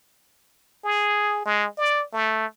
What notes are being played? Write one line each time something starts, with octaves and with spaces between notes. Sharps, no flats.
G#4
G#3
D5
A3